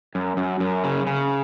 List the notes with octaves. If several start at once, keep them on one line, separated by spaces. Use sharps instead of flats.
F#2
F#2
F#2
C#3
C#3